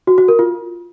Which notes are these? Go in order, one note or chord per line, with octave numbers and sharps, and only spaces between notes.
F#4
F#4
A#4
F4